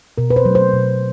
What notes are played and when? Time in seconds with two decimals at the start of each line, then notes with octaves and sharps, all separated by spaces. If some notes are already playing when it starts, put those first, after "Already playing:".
0.18 B2 A#4
0.30 B4
0.36 C5
0.45 F#3 A3
0.55 C5
0.74 B2